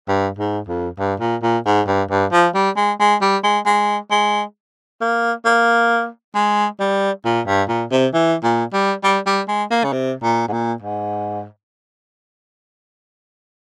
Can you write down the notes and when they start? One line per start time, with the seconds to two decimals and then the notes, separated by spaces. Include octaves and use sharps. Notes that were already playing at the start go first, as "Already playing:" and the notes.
0.08 G2
0.38 G#2
0.68 F2
0.98 G2
1.20 A#2
1.42 A#2
1.65 G#2
1.87 G2
2.10 G2
2.32 F3
2.54 G3
2.76 G#3
3.00 G#3
3.21 G3
3.43 G#3
3.66 G#3
4.11 G#3
5.01 A#3
5.45 A#3
6.34 G#3
6.80 G3
7.25 A#2
7.46 G2
7.69 A#2
7.91 C3
8.13 E3
8.43 A#2
8.73 G3
9.03 G3
9.26 G3
9.48 G#3
9.70 A#3
9.84 C#3
9.92 C3
10.22 A#2
10.48 G#2
10.52 A#2
10.82 G#2